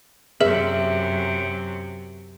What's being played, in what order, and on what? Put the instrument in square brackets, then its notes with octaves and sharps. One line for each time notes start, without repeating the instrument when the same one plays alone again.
[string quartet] F#2 C3 [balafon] G#4 [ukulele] E5